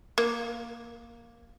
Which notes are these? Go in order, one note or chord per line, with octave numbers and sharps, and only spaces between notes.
A#3